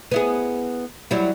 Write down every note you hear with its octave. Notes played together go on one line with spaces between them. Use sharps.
B3 E4 G#4
F#3 G3 E4